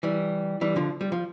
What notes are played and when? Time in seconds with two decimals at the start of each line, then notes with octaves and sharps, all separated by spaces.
0.03 E3 G3
0.61 E3 G3
0.76 D3 F3
1.01 G3
1.12 F3